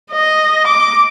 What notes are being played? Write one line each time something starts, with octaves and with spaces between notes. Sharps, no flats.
D#5
D6